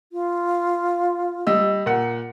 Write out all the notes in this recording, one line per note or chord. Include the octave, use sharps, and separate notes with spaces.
F4
G3 D#5 E6
A#2 F#5